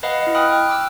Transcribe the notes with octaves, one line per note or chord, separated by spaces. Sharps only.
B4 D#5 F5 F#5 B5
E4 D#5
G5 B5 D#6 F6 F#6
G5 F6 F#6
D6 E6